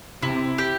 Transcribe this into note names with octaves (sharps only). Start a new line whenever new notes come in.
C3 E4
G4